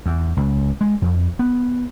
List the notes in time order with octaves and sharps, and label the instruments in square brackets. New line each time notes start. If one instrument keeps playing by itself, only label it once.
[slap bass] E2
C#2
G#3
F2
B3